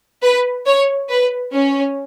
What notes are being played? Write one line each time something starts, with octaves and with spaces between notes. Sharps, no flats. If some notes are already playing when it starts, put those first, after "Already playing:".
B4
C#5
B4
C#4